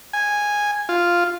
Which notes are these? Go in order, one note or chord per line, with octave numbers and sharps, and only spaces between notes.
G#5
F4